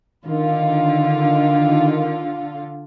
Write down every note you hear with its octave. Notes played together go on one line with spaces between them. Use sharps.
D3 D#3 F4